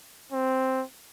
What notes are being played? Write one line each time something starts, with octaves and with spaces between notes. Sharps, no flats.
C4